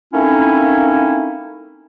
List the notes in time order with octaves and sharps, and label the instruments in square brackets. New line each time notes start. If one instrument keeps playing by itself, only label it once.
[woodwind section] A3 A#3 C4 C#4 D#4 E4